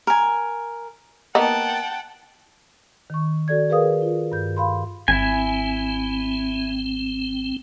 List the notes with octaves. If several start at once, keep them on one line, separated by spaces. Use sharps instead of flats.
A#4 G#5
A#3 B3 D#4 F#5 G5 A5
D#3 C#6
F#4 A4 D5 G#6
G#4 A#4 B4 F5 D#6
F4
G2 G6
F5 B5 C6
G#1 C4 E4 G#5